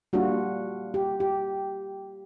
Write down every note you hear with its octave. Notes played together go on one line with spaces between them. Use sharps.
G3 A#3 D4 F4 F#4
G4
G4